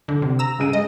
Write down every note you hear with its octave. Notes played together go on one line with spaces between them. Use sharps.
D3
C3
A#5 E6
C#3 G#4 D#7
G#3 D#5